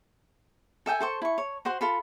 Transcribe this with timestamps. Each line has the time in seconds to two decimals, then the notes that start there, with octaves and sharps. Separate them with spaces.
0.86 A4 E5 G5 G#5
1.01 A4 C5 C#6
1.22 E4 C#6
1.38 C#5
1.65 F#4 C5 F#5 C6
1.81 F4 A4 B5